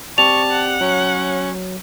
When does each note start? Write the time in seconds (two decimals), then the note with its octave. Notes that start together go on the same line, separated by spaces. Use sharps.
0.18 C4 G4 D5 A5 C#6 F7
0.51 F#5
0.81 F#3 C#4